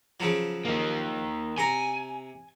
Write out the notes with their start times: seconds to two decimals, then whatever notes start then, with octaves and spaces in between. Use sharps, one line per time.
0.20 C#3 F3 F#3
0.65 D#3 A#3
1.58 C3 G#5 A#5